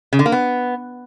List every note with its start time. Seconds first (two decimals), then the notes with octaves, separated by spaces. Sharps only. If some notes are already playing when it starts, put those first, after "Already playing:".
0.13 C#3
0.19 D3
0.26 A#3
0.32 B3